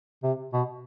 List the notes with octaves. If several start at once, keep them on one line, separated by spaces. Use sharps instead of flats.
C3
B2